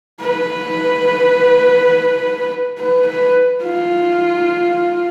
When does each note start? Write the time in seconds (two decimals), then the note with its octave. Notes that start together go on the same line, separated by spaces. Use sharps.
0.21 B4
2.78 B4
3.06 B4
3.64 F4